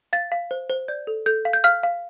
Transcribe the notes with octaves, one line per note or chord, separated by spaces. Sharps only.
F5 A6
F5
C5
C5
D5 G6
A4
A4 G6
F5
G6
F5 F6
F5